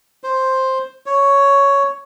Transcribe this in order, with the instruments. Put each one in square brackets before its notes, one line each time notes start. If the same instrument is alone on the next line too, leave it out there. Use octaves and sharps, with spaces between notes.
[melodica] C5
C#5